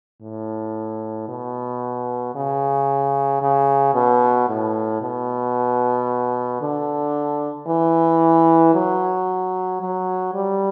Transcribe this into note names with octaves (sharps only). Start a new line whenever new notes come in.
A2
B2
C#3
C#3
B2
A2
B2
D3
E3
F#3
F#3
G3